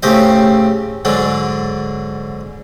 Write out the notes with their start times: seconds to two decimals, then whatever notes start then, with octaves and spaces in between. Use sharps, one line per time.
0.03 A2 C#3 C4 G4 D#5
1.05 G#2 D3 F#3 D4